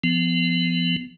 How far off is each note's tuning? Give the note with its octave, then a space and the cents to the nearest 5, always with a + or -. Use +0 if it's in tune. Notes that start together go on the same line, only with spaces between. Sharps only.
F3 -15 B3 +25